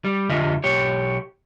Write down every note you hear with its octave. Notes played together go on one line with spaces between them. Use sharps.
G3
F2 D3 F4 G4 D#5 E5
B1 G4 C#5